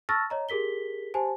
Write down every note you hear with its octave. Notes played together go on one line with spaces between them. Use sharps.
A5 C#6 E6 F6 A6 A#6
C#5 D#5 A#5
G4 G#4 A#4 B6 G7
G4 C5 G#5 A5